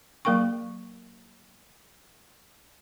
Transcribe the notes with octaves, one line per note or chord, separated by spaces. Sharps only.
F#3 A#3 A#4 G5 C#6